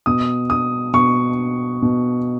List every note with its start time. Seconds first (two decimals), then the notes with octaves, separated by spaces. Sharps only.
0.06 B2 D#6
0.50 D#6
0.93 B2 C#6
1.82 B2